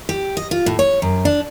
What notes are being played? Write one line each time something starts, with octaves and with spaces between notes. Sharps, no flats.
G4
D#5
F4
A2
C#5
F#2
D4